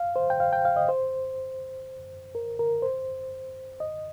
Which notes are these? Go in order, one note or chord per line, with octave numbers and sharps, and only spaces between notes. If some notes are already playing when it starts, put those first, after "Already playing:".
Already playing: F5
C5
G5
F5
G5
F5
D#5
C5
A#4
A#4
C5
D#5